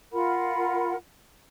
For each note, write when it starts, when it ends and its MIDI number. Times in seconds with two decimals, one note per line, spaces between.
0.13 0.95 65
0.13 0.95 70
0.13 0.95 78
0.13 0.95 83